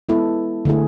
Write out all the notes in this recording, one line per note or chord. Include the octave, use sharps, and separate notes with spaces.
G#3 B3 E4 A4
D3 A3 E4 G#4